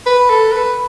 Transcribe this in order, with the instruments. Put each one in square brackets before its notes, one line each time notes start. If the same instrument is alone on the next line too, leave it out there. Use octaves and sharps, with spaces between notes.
[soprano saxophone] B4
A4
B4